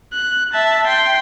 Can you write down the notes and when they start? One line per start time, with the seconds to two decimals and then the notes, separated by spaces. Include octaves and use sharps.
0.13 F#6
0.53 E5 A5
0.87 G5 C6